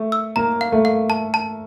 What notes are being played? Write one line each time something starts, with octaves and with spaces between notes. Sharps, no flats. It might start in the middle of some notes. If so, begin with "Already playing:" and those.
Already playing: A3
E6
A#3 A#5
F5
A3
F5
A5
A5